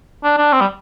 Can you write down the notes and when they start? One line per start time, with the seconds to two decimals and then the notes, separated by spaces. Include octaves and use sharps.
0.24 D4
0.38 D4
0.53 C4
0.61 G3